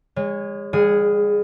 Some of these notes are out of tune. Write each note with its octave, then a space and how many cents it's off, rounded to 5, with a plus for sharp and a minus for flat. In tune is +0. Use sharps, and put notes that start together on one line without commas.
G#3 -35 C#5 +0
G3 +40 G#4 +0 F#5 +0